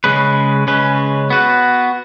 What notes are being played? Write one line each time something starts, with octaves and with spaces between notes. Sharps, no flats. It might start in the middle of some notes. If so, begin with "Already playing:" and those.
C#3 G#3 C#4 B4
C#3 G#3 C#4 B4
B3 F#4 B4